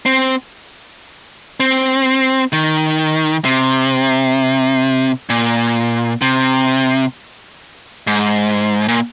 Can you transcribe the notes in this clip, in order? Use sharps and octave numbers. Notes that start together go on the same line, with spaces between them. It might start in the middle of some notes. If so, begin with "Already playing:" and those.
C4
C4
D#3
C3
A#2
C3
G#2
A#2